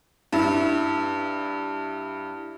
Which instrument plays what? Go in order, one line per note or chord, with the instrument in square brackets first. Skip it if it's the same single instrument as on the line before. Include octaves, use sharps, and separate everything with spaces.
[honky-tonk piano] G2 E4